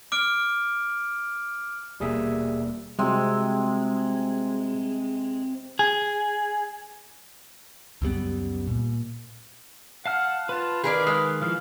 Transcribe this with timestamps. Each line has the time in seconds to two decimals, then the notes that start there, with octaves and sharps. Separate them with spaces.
0.12 D6 F6 D7
2.00 D#1 B2 G3 A#3 G#4 E5
2.99 C3 G3 G#3 C4 F#4
5.79 G#4
8.02 C#2 F#2 G3 B3
8.67 A#2
10.06 F5 F#5 A5 F6
10.49 F4 B4 A5
10.84 D#3 G#4 A#4 B4 D5 F5
11.07 G#3
11.42 E3 F3 F5